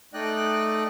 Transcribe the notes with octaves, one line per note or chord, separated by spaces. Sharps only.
A3 D#4 D5 D#5 G5 F#6